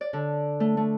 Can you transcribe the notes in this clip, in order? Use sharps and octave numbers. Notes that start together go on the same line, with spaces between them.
D5
D3
A3
A3